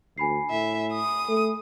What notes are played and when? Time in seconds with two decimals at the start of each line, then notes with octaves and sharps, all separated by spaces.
0.18 D2 G#5 B5 C7
0.50 A2 E5
0.93 D#6
1.29 A3